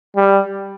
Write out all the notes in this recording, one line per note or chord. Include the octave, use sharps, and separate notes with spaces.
G3